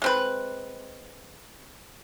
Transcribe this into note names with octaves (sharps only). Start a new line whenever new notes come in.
G#3 C4 B4